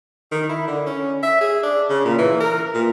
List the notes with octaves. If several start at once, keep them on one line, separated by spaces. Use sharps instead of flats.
D#3
E4
D3
C#4
E5
G#4
D4
C#3
A#2
E3
A#4
A#2